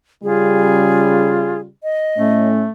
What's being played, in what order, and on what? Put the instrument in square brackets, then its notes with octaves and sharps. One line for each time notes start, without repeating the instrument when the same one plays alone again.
[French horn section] C#3 G3 [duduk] F4 [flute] G#4
[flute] D#5
[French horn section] A2 C#4 [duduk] A3